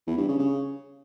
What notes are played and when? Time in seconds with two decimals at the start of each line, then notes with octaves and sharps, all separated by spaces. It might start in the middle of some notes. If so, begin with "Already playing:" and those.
0.07 E2
0.18 G2
0.28 C#3
0.39 C#3